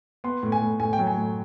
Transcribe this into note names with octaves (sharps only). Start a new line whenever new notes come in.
B3 C6
A2
G#5
A2
A2 G#5
G5
F#3
G#5
A2